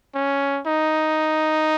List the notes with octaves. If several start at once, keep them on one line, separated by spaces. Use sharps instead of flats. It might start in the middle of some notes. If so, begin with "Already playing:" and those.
C#4
D#4